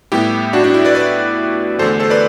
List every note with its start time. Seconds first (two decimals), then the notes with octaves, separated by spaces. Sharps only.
0.12 A2 G3 B3 E4 G4
0.53 D4 F#4
0.64 D4
0.74 E4
0.85 B4 D5
0.95 B4 D5
1.79 E2 D3 A3 A4 C5
2.00 A4 C5
2.10 B4 D5